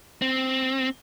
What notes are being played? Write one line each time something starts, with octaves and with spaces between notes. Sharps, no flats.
C4